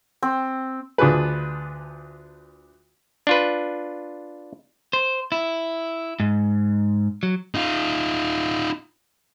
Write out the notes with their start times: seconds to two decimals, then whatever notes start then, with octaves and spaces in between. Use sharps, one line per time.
0.23 C4
0.98 D2 D4 F4 G#4 B4
3.27 D4 F4 B4
4.93 C5
5.32 E4
6.20 G#2
7.23 F#3
7.55 D#4 F4